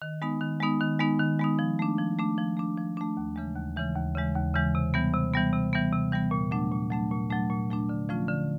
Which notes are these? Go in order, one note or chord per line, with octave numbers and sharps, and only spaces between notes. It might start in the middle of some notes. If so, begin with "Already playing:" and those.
D#3
G#3 B3 D#4
D#3
G#3 B3 D#4
D#3
G#3 B3 D#4
D#3
G#3 B3 D#4
F3
A3 D4
F3
A3 D4
F3
A3 D4
F3
A3 D4
D#2
C#3 E3 G#3
D#2
C#3 E3 G#3
D#2
C#3 E3 G#3
D#2
C#3 E3 G#3
C3
E3 G3 B3
C3
E3 G3 B3
C3
E3 G3 B3
C3
E3 G3 B3
A#2
F#3 A3 D4
A#2
F#3 A3 D4
A#2
F#3 A3 D4
A#2
F#3 A3 D4
D3
F3 A3 C#4 F4
D3